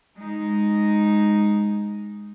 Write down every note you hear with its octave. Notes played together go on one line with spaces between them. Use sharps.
G#3 D#4